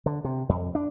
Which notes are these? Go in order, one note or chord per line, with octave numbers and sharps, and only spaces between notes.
D3
C3
F2
D4